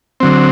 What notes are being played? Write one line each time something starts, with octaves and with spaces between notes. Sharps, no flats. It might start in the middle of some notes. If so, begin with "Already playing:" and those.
D3 F#3 C4